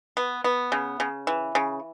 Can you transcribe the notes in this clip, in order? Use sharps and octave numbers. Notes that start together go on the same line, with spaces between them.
B3
B3
C#3
C#3
E3
C#3